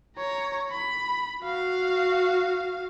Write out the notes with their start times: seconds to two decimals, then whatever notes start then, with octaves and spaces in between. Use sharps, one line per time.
0.17 C#5 A#5
0.71 B5
1.44 F#4 F5